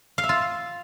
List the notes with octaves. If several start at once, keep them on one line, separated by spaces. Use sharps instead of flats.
F5
E5
F4